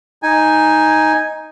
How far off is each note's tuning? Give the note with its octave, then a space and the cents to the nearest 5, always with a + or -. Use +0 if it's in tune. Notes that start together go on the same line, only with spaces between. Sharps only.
D#4 +5 G#5 -5